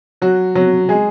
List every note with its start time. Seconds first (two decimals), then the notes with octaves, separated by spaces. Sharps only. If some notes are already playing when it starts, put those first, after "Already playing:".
0.22 F#3 F#4
0.55 F#3 F#4
0.89 G#3 G#4